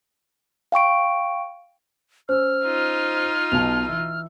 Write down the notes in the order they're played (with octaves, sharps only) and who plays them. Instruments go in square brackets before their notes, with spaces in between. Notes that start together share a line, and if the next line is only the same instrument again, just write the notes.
[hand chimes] F5 G5 C#6 D7
[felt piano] C#4 [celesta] C5 E6 [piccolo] F6
[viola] D#4 F4
[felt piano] B1 B2 [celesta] A5 F7
[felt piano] E3 [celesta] E6